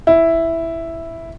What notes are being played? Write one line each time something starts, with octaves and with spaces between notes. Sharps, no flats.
E4